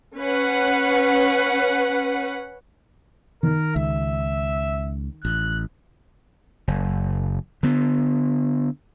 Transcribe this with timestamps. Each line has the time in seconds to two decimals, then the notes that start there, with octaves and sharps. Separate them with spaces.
0.17 C#4 B4 F#5
3.43 D#3 A#4
3.76 C#2 E5
5.25 A1 F#6
6.68 F#1
7.63 D3 B3